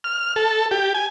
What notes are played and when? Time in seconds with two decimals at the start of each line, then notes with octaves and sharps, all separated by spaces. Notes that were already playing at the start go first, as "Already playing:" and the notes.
0.04 F6
0.36 A4
0.71 G4
0.94 G#5